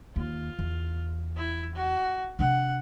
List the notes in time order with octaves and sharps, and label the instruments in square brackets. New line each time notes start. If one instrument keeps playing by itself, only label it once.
[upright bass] D#2 [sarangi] F4
[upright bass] E2
[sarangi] E4
F#4
[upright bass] C3 D4 [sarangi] F#5